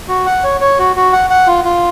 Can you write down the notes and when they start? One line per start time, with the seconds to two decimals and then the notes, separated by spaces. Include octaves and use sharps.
0.08 F#4
0.26 F#5
0.44 C#5
0.61 C#5
0.79 F#4
0.96 F#4
1.13 F#5
1.30 F#5
1.47 F4
1.65 F4